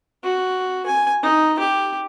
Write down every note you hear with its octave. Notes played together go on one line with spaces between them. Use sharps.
F#4
G#5
D#4
G4